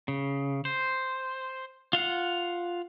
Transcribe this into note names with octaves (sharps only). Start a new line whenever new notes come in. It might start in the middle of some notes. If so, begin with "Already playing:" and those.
C#3
C5
F4 F5 F#5